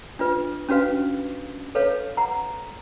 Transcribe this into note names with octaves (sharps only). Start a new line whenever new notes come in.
D4 F4 B4
C#4 D4 F#4 B4 F5
A4 B4 C#5 F5
F#5 A#5